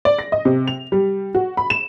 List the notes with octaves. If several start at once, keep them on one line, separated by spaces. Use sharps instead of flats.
D5
A#6
D#5
C3
F7
G3
F#4
B5
E7